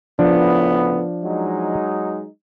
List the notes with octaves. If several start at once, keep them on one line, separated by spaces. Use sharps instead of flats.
A2 C#3 F3 B3 D4
F#3 G#3 D#4